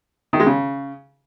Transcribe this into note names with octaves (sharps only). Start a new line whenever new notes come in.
D#3
G#3
C#3